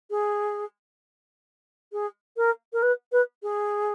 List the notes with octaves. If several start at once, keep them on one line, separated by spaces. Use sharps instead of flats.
G#4
G#4
A#4
A#4
B4
B4
G#4